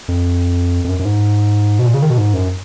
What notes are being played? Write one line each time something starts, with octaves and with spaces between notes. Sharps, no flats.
F2
F2
F#2
F#2
G#2
B2
A#2
C#3
D#3
B2
G#2
F#2